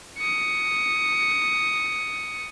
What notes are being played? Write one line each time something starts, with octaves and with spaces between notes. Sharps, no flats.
D#6 C#7